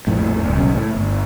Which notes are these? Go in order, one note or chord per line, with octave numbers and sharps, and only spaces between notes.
A#1 F2 A2
D1
B1 C#3
A2
G1